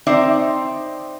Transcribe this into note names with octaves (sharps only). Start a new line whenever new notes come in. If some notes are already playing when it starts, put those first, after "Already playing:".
C4 D#4 C5 D5 E5